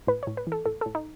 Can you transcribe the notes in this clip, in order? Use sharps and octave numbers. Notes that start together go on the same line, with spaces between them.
A2 B4
C#5
A2
B4
E3
A4
A2 A4
A4
A2
D#4